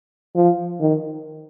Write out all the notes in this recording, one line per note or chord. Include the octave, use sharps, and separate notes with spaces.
F3
D#3